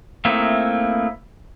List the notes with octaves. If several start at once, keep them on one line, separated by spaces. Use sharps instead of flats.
A3 A#3 C4 D#4 E4